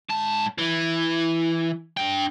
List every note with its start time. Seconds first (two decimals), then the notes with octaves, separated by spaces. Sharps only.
0.10 G#2 A5
0.58 E3
1.97 D4 G5